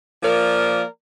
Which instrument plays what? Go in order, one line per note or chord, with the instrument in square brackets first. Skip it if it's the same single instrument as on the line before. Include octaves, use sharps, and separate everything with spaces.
[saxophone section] F3 A#3 A#4 D5